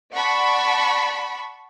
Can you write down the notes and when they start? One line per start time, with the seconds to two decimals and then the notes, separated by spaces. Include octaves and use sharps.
0.12 D5 F#5 A5 B5 C#6